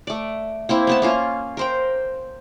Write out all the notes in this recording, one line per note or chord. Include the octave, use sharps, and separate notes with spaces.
A3 D5
A#3 C4 E4
A3 B3 A5
A#3 C#4 F4
A#4 C5 G5